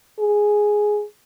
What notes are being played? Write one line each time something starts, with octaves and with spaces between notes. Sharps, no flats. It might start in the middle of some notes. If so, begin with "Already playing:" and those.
G#4